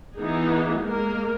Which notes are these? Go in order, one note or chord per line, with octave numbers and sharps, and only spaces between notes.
E3 B3 D#4 G#4
G#3 A#3 A#4